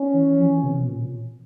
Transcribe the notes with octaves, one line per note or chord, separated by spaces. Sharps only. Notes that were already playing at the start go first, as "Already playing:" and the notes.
Already playing: C#4
E3
F3
E3
C3
B2
A#2